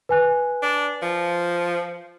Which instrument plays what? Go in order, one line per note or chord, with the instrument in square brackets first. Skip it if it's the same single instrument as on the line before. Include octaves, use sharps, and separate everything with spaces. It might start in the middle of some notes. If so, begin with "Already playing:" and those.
[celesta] B4 G#5 F#6
[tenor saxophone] D4
F3